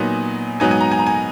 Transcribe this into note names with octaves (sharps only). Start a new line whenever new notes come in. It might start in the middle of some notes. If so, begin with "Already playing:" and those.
Already playing: A#2 F#3 B3 D#4 G#5
G#2 F#3 B3 D#4 G#5
G#5
A#5
G#5
A#5
G#5